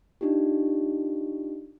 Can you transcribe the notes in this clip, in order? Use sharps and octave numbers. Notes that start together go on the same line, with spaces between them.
D4 D#4 F4 G4